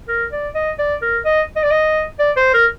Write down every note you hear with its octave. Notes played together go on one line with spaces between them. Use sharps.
A#4
D5
D#5
D5
A#4
D#5
D#5
D5
D#5
D5
C5
A#4